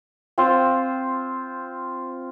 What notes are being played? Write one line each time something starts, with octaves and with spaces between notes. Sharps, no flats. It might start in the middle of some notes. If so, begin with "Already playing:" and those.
C4 F4 C5